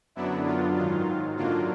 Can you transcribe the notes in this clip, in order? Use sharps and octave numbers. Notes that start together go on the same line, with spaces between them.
F#2 D3 F#3 B3 D4 E4
F4
G#2 D#3 F#3 F4
F#2 D3 F#3 A#3 D4 F4